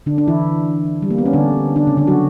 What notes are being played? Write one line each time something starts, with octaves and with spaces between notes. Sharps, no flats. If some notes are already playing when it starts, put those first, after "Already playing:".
D3 D4
D4
E3 E4
G3
A#3
B3
C#4
D3 D4
D3 D4
C#3 C#4
D3 D4
F#3 F#4